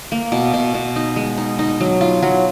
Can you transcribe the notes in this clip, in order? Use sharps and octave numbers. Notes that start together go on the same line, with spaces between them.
A#3
B2
B2
B2
D#4
G#3
D#4
D#4
F#3
F4
F#3